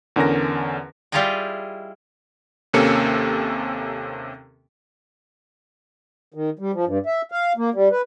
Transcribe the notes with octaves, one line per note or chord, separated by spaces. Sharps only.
E2 D3 C#4 A#4 A#6
G3 E4 F4 G#4 D#5 G5
D#2 C3 A#3 C#4 A4 C#7
D#3
G3
F3
G2
E5
F5
A#3
G3
B4